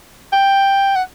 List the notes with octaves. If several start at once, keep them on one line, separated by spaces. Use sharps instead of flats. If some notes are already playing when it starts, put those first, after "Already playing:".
G5
F#5